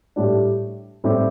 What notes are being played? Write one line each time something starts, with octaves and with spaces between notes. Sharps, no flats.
A2 G3 D4
A2 G3 C4 E4 G4